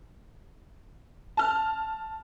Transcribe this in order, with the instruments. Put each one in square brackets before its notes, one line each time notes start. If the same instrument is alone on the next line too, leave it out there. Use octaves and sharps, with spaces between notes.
[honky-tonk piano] A5 F6